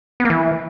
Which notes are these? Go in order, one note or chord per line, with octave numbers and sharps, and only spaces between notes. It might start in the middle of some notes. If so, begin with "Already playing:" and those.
B3
A#3
E3